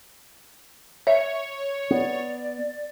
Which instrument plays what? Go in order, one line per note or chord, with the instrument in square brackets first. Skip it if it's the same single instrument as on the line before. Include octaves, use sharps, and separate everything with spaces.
[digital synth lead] C#5 [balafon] E5
[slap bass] B3 [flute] D5